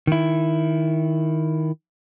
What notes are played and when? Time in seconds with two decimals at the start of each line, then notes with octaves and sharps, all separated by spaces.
0.07 D#3 E4